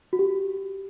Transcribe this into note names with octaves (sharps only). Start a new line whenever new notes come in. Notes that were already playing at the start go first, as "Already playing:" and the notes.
F#4
G4